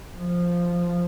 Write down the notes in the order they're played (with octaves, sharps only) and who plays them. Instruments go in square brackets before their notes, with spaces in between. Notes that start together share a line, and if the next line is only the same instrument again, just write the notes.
[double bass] F3